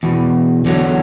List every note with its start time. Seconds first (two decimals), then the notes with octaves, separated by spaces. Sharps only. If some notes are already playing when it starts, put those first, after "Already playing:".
0.03 E2 B2
0.65 E2 D3 F#3